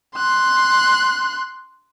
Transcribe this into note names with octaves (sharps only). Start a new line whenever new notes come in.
C6 F#6